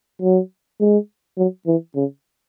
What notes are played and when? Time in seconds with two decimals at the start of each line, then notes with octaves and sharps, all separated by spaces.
0.22 F#3
0.81 G#3
1.38 F#3
1.67 E3
1.96 C#3